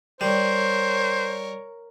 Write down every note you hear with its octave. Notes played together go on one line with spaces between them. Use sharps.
G3 A#4 C5 C#5